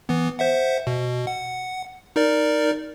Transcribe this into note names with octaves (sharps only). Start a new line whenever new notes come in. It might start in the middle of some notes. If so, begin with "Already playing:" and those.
E3 B3
C5 E5 F#5
B2
F#5
D#4 A#4 D5